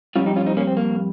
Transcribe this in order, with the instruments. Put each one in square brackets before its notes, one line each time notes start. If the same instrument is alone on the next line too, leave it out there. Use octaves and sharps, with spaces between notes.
[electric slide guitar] F2 C#3 G3 C#4 F4
D#4 G4
C#4 F4
C4 D#4
A#3 C#4
C4
A#3